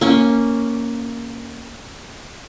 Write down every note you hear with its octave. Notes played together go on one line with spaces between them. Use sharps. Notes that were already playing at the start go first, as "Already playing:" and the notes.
A#3 C#4